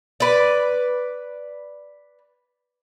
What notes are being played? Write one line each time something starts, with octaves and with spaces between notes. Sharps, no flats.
B4 D5